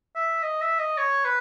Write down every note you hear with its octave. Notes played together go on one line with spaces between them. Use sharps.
E5
D#5
E5
D#5
C#5
B4